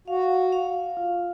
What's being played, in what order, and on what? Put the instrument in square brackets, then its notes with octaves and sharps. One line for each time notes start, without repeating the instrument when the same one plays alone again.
[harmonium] F#4 [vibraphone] F5
[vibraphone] F5
F4